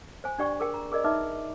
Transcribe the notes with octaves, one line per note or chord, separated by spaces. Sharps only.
C5 G#5
D4 G4 D5 G5 C#6
G#4 A#4 G5
A#5
G#4 A#4 D5 D#5
D#4 B4 E5 D6